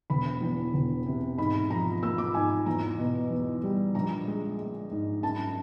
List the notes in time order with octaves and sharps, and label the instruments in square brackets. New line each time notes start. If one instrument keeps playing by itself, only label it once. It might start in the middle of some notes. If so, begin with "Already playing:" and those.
[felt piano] E1 B5
E2
E1
C3
G#2 B5
F3 A#5
A#3 E6
D6
G#2 G#5
E2 A#5
B2
E2
G3
A#1 A#5
G#3
G#3
G#2
F#2 A5